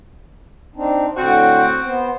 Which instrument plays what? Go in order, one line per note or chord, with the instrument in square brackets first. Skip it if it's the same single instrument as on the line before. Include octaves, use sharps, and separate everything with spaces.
[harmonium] C4 D4 D#4
[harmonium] A2 D3 [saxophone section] C4 F#4
[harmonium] B3 C5